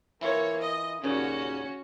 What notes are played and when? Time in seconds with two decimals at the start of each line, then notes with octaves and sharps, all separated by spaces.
0.21 E3 A#3 E4 F4 C#5
0.59 D#5
1.04 D#2 A#2 C#3 C#4 F#4